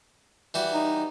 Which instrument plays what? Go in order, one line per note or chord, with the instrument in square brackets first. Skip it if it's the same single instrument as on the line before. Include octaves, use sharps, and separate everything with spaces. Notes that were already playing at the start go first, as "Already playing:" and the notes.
[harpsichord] E3 G3 F#4
[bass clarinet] D#4